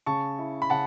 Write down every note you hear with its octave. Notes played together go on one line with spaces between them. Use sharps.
C#3 A5 C#6
E4
B5
C#3 F#5 A5